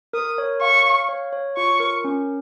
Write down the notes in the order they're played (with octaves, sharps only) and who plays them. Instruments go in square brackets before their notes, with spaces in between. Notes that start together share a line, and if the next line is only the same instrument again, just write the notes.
[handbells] A#4 [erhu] D#6
[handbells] C#5
[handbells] F5 [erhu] C#6
[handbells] F5
C#5
C#5
[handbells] F4 [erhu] C#6
[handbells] A#4
C#4